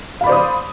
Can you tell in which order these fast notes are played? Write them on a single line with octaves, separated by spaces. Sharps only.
F5 B5 D5 C5 D#6